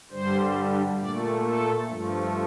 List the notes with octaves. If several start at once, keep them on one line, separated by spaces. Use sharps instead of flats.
G2 D3 G3 C5
A#2 A3 D5
A4
G2 F3 A3